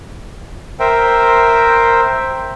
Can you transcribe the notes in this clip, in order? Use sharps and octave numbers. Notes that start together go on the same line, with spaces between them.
A#4 C5 E5 G5